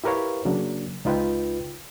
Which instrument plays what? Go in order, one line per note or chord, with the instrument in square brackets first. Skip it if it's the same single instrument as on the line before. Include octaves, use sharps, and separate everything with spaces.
[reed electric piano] E4 G4 A#4 B4 C#5 F5
C#3 F#3 A#3 D4
C#2 D#4 F4 B4 G5